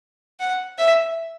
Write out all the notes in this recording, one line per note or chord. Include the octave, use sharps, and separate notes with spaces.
F#5
E5